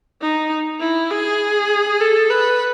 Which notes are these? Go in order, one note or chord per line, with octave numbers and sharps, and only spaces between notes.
D#4
E4
G#4
A4
B4